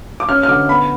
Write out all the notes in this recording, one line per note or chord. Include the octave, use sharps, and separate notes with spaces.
D6
C#4 F6
F6
D3 D6
B3 B5